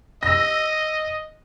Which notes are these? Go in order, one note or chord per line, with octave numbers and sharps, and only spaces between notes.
D#5 E6 A#6